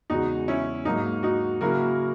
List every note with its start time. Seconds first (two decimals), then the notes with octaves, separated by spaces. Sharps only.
0.10 E2 C#3 G#3 D#4 F#4
0.48 C#4 E4
0.85 G#2 F#3 A#3 D#4
1.23 D#4 F#4
1.61 C#3 F#3 A#3 E4 F#4 A#4